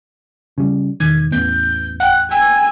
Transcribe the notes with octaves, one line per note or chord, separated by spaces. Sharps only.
C#3 G3
E1 D#3 G#6
A1 E2 B3 G6
F#5 G5 F#6
G5 G#5 E6